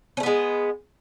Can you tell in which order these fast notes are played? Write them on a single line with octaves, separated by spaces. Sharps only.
C#4 A3 B3 G#3